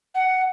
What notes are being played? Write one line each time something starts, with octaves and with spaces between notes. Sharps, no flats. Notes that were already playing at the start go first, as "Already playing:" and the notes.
F#5